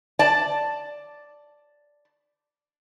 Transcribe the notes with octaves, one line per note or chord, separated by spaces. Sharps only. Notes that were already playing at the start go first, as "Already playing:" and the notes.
D5 A5